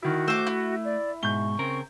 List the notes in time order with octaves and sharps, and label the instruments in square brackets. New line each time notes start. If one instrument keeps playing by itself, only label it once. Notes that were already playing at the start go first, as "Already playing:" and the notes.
[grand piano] D#3 E4 [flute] F#4
[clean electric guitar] A3 [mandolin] C5 D6 [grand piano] E6
[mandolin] E4
[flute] D5
[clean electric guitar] G#2 B2 [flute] C#6 [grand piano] G6 G7
[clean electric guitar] C#3 C4 A#4